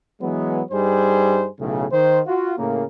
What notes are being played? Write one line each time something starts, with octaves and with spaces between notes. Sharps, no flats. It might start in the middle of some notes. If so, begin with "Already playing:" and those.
E3 F#3 G#3 B3
G2 G3 D#4 G#4 C5
B1 A2 C#3
D#3 C5
F4 F#4
A2 C#3 A#3